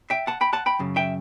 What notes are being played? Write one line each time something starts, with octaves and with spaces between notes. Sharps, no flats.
E5 G5
F#5 A5
G5 B5
F#5 A5
G5 B5
F#2 C#3
E5 G5